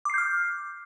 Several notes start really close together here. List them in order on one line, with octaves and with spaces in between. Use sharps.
D6 C7 G6 F6